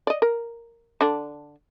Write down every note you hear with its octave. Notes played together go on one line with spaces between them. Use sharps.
D5 D#5
A#4
D3 D4